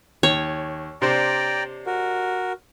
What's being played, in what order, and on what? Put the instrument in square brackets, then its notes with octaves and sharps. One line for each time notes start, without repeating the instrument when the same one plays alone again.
[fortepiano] D#2 [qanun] C#5
[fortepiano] C3 D4 C5 [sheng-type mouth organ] D5 G5 A#5
[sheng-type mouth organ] F#4 A#4